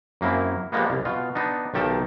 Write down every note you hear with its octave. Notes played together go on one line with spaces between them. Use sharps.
F#2 A#3 C4 E4
F3 G3 G#3 A#3 B3
C2
B2 F4
B3 D4 D#4
B1 D#3 G4 A4 A5